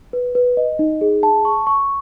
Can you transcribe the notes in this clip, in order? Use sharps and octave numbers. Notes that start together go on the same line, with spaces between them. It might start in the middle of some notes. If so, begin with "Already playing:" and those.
B4
B4
D#5
D#4
G#4
A5
C#6
C#6